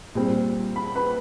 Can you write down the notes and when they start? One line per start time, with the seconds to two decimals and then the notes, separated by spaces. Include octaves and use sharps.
0.15 A#2 G3 C4
0.76 B5
0.95 B4 B5